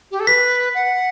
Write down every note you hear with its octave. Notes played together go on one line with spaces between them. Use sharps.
G4
A4
B4 B6
F#5